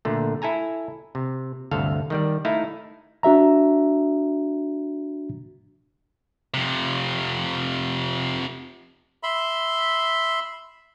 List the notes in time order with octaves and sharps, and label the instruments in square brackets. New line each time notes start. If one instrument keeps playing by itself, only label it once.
[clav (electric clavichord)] A#2 D3 A3
E4 A4 G#5 A#5
C3
G1 D2 C3 A4 F5
D#3 G3 D5
A3 D#4 E4 F5
[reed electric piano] D4 F#4 E5 A#5
[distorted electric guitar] F2 C3
[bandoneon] E5 B5 C6